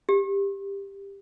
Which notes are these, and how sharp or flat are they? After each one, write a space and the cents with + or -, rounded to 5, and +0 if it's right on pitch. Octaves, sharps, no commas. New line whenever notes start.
G4 +15